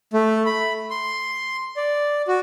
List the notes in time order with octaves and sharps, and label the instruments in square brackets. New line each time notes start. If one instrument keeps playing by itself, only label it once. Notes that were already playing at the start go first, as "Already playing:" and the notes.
[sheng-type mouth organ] A3
B5
C6
D5
F#4